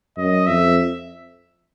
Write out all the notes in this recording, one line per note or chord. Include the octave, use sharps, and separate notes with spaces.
F#2 D#5
F2 E5